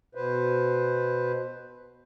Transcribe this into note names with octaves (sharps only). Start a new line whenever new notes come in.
B2 B4 C5